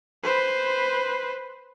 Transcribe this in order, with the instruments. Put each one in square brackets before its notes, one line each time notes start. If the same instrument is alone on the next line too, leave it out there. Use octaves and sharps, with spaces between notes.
[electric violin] B4 C5